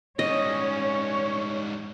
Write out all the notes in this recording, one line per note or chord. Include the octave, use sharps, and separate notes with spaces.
G#2 G3 C#4 C#5 D#5